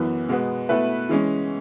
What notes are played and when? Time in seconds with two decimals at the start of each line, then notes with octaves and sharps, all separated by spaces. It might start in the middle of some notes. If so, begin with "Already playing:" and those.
Already playing: F#2 E3 B3
0.29 B2 G#3 B3
0.69 B2 A3 E4 B4
1.09 E3 G#3 C#4